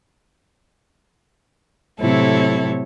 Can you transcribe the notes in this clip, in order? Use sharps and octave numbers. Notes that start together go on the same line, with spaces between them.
A2 C3 F#3 E4 A4 C#5